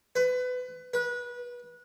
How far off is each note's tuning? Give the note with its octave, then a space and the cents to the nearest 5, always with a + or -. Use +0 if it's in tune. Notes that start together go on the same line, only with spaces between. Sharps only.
B4 +25
B4 -25